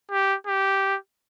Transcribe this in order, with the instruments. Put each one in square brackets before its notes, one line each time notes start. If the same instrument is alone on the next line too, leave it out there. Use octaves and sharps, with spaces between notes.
[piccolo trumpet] G4
G4